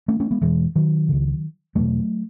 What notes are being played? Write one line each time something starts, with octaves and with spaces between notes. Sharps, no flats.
A3 C#4
A3 C#4
G#3 B3
E2 B2 E3 G#3
D#3 F#3
C#2 C#3
E2 B2 F#3 A3